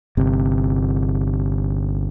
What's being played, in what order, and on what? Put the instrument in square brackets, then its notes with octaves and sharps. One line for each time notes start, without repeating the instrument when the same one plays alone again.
[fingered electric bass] G1 C3